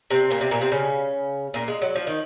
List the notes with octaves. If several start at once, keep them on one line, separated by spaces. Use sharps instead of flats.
C3 C4
A#2 A#3
C3 C4
A#2 A#3
C3 C4
C#3 C#4
A#2 A#3
G#3
F#3
F3
D#3